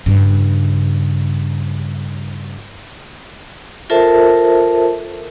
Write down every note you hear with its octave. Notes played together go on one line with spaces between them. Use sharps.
G2 C#3
F4 A4 A#4 C5 E5 A5